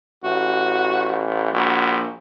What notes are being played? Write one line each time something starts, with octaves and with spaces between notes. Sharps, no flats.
A1 F#4
A#1 F#4